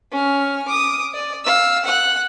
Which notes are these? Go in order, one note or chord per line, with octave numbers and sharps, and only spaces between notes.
C#4 F6
D6 D#6
D5
F5 E6
F#5 F#6